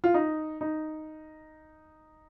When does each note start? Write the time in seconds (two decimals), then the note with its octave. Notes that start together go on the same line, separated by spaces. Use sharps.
0.04 F4
0.14 D#4
0.61 D#4